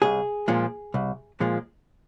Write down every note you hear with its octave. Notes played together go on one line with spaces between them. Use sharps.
C2 G#4
A#2 F3 G#3
C2
A#2 F3 G#3